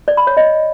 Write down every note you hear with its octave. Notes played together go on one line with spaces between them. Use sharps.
D5
B5
C#5
D#5